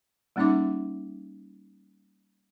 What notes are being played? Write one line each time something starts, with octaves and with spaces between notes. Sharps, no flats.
G3 A#3 C#4 D#4 E5 D6